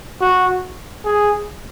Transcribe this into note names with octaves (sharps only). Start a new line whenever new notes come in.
F#4
G#4